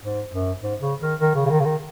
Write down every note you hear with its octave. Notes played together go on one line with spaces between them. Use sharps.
G#2
F#2
G#2
C#3
D#3
D#3
C#3
C#3
D#3
C#3
D#3